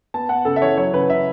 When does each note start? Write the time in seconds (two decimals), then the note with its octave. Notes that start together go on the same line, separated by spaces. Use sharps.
0.14 B3 A5
0.29 B3 F#5
0.45 C#3 A4
0.56 E5
0.62 E3 C#5
0.78 F#3 C#5
0.93 C#3 B4
1.09 C#3 E5